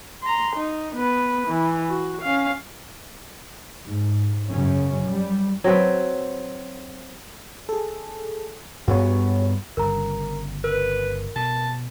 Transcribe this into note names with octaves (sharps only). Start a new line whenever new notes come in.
A#5 C6
D#4
B3 B4
E3
F#4
C#4 F5
G#2
F#2 C#3 C#4
G3
F#3 C4 B4
G#4 A4
G2 B3 F#4 G#4 C#5
G1 G2 C#3 A#4 A#5
A#4 B4
B2 A5